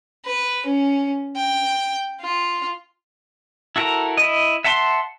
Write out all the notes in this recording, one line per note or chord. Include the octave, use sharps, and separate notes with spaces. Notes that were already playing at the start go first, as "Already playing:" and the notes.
B4
C#4
G5
F4
E4 F#4 A4 A#4 A#5
E4 D#5
E5 F#5 A5 A#5 C6